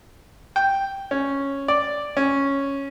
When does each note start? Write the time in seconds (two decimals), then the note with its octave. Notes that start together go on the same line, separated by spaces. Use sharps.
0.56 G5
1.11 C#4
1.68 D5
2.17 C#4